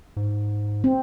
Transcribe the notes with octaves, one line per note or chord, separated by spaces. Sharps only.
G#2
C4